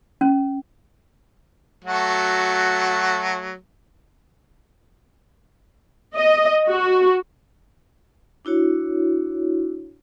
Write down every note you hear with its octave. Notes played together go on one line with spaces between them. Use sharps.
C#4
F#3 A3 F#4
D#5
F#4
D4 E4 F#4 C#5